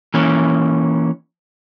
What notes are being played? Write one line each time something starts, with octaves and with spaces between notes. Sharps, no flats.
E3 A#3 C#4